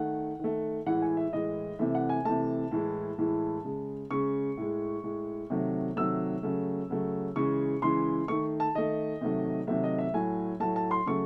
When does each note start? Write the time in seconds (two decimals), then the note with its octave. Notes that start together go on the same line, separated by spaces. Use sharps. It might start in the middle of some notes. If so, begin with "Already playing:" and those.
Already playing: D#3 A3 F#5
0.39 D#3 A3
0.86 A2 E3 G#3 F#5
1.02 G#5
1.17 E5
1.33 A2 E3 G#3 D#5
1.79 C3 E3 A3 E5
1.95 F#5
2.09 G#5
2.25 C3 E3 A3 A5
2.71 A2 E3 G#3
3.18 A2 E3 G#3
3.64 C#3 G#3
4.11 C#3 G#3 C#6
4.57 A2 G#3
5.04 A2 G#3
5.50 C3 D#3 F#3 A3
5.96 C3 D#3 F#3 A3 E6
6.43 C#3 F#3 A3
6.90 C#3 F#3 A3
7.36 C#3 E3 G#3 C#6
7.82 C#3 E3 G#3 C6
8.28 D#3 A3 C#6
8.60 A5
8.75 D#3 A3 D#5
9.21 C3 D#3 F#3 A3
9.67 C3 D#3 F#3 A3 E5
9.84 D#5
9.99 E5
10.14 A2 F#3 A3 G#5
10.60 A2 F#3 A3 A5
10.76 A5
10.91 C6
11.06 C#3 F#3 A3 C#6